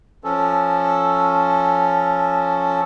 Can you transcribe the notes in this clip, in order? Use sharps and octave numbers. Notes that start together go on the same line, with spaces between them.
F3 C#4 A4